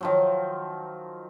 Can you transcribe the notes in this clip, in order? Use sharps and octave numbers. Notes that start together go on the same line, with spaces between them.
D#3 F3 F#3